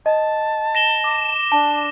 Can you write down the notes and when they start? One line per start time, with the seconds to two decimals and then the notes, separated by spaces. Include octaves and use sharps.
0.06 D#5 A5
0.75 A#6 E7 G7
1.04 D6
1.52 D4 A5